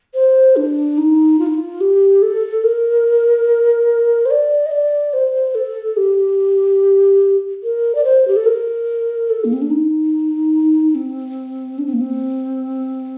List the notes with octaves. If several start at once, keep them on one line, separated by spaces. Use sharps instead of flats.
C5
D4
D#4
F4
D#4
F4
G4
A4
A#4
C5
D5
D#5
D5
C5
A4
G4
A#4
D5
C5
G4
A4
A#4
A4
A#3
C4
D4
D#4
C4
D4
C4
A#3
C4